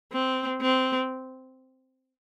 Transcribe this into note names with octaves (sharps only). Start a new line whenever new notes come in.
C4
C4